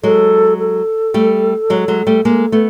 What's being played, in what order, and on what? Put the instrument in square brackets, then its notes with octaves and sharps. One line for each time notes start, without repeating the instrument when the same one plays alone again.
[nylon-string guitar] F#3 G#3 [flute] A4
[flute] A4
[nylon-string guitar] G3 A3
F#3 G#3
F#3 G#3
G3 A3
G#3 A#3
A3 B3